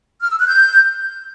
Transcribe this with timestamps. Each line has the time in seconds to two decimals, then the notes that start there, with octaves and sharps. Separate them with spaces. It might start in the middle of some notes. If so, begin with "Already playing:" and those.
0.21 F6
0.30 E6
0.38 F#6
0.47 G6